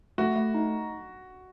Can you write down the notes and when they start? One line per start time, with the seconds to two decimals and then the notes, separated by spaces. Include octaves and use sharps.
0.18 A3 F#4
0.36 A3
0.54 D#4